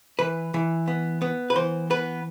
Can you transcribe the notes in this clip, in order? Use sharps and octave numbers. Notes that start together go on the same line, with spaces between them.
E3 B4
E3
B3
B3
B4
E3 C5
B3 B4